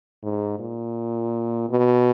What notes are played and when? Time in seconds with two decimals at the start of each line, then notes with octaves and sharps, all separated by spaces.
0.23 G#2
0.59 A#2
1.70 B2